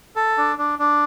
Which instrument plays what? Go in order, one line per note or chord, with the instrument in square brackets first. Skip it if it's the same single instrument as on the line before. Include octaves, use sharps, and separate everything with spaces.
[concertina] A4
D4
D4
D4